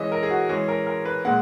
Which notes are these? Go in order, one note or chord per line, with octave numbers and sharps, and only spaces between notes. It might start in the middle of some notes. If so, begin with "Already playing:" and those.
Already playing: E3 G#3 C#4 D#5 E5
A#4
G#4
F#4
E3 G#3 C#4 G#4
A#4
A#4
B4
A#2 G#3 F#5